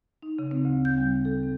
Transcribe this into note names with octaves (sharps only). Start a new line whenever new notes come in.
D#4
C#3
C4
D2
G6
G3
A4
C4